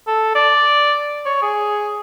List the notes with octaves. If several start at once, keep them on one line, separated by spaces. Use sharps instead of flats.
A4
D5
C#5
G#4